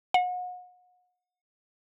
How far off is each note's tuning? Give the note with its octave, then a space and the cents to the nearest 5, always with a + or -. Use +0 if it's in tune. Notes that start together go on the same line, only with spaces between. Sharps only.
F#5 -35